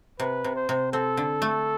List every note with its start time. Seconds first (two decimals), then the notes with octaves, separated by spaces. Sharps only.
0.20 C3 B4
0.44 C3
0.56 C5
0.69 C3
0.93 C4 A4
1.17 D3
1.42 A3